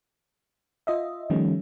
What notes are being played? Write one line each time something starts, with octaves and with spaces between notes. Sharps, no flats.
F4 D#5 E5
D#3 F3 G3 A3 C#4